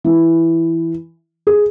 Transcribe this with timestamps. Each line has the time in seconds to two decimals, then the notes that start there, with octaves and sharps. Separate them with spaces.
0.04 E3
1.47 G#4